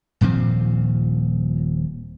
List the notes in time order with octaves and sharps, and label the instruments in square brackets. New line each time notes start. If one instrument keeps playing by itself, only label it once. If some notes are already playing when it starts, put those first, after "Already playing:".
[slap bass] D#1 A#2 F3 C4